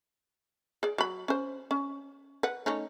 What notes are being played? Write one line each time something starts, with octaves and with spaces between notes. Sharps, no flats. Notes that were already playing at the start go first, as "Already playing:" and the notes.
G#4 D5
F#3 B5
C#4 C5
C#4
B4 F#5
A3 C#4 D#4